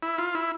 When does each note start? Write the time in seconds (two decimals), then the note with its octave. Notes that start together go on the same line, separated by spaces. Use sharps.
0.03 E4
0.18 F4
0.35 E4